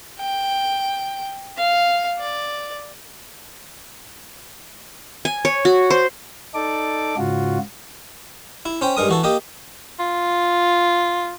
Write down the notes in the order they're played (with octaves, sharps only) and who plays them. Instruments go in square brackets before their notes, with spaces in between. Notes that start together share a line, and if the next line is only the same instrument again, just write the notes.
[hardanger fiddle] G5
F5
D5
[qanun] G#5
C#5
F#4
C5
[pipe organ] D#4 A4 D5 D6
G#2 C#3 F4 F#4
[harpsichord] E4
C#4 C5 G5
G2 G#3 A#4 D#6
E3 F#4 A4
A#3 G4 D#5
[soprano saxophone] F4